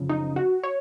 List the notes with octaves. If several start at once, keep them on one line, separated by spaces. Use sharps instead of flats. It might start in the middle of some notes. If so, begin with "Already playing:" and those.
Already playing: F#2 C#3 F3
D#4
F#4
C#5